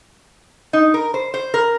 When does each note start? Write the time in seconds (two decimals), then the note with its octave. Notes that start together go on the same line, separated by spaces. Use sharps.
0.73 D#4
0.94 A#4
1.14 C5
1.34 C5
1.54 A#4